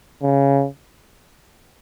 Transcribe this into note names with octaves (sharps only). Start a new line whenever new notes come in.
C#3